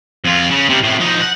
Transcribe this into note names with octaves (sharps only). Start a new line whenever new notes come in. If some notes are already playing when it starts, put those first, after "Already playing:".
F2 F4
C#3
C3 G3
A2 C3
F3 D#4
F#5